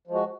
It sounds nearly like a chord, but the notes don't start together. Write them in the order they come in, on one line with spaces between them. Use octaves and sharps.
F3 G#3 F#4